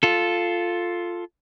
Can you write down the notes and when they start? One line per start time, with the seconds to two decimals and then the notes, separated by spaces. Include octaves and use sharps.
0.03 F4 A4